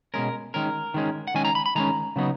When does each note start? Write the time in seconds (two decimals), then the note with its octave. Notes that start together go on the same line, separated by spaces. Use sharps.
0.14 B2 G#3 C#4 A#4
0.54 D#3 G#3 C#4 A#4
0.94 D#3 G#3 C#4
1.27 F#5
1.34 D#3 G#3 C#4 G#5
1.45 A#5
1.55 B5
1.66 B5
1.75 D#3 G#3 C#4 A#5
2.16 C#3 F#3 B3 D#4